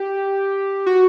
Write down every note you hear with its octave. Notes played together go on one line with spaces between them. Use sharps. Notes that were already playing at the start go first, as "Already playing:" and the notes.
Already playing: G4
F#4